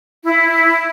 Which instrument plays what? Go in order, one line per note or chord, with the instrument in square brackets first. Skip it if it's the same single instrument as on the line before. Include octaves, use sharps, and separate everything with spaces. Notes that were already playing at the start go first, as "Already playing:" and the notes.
[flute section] E4